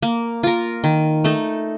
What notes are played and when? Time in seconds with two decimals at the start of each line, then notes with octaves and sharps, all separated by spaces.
0.02 A#3
0.43 F4 A#4
0.84 D#3
1.24 A3 D#4 A4